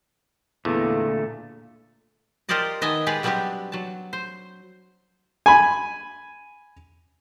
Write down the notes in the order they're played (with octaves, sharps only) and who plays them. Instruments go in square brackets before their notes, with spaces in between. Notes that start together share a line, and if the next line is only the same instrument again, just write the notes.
[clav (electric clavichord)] E2 [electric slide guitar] A#2 D3 A3
[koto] F4 G4 A#4 C5 D5 D#5
D#3 B3 D#5 E5 G#5 A5
G#3 G4 G#4 B4 D5
F#3 G3 B3 C4 D4 G4
F#3 A5
C5
[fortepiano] G#5 B5